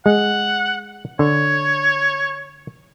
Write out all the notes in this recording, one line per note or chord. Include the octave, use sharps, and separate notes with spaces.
G#3 F#5
D3 C#5